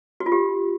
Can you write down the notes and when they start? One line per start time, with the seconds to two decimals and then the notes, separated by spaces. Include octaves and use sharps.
0.20 F#4
0.26 F4
0.32 G4